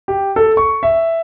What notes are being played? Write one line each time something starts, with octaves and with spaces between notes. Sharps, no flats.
G4
A4
C#6
E5